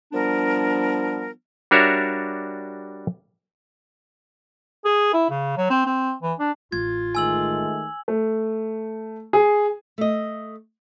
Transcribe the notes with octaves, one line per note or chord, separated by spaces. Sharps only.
F3 G3 B3 D4 A#4
G3 D4 F#4 A#4 C#5 E5
G#4
E4
C#3
F#3
C4
C4
E3
D4
A1 F4 G#6
D#3 G#3 A3 G#5 E6 F#7
A3
G#4
A3 D#5